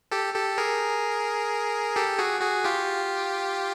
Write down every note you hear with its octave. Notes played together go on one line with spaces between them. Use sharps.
G4 A4
G4 A4
G#4 A#4
G4 A4
F#4 G#4
F#4 G#4
F4 G4